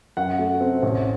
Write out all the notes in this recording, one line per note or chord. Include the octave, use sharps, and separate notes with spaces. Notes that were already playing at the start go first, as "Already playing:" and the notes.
F#2 F#5
A3
C4
A1